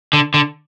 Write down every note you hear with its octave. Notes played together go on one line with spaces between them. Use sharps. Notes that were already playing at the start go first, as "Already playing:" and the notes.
D3
D3